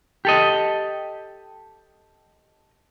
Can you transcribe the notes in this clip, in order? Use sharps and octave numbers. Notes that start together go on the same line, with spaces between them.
G4 A4 D#5